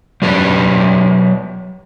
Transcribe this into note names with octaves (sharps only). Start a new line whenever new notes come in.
F#3 G4 B4 D5